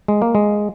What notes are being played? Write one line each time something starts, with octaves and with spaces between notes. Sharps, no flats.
G#3
A#3
G#3